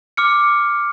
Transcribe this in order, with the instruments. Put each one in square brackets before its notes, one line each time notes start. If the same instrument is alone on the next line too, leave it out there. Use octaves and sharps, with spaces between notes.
[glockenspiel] D6 F6 C#7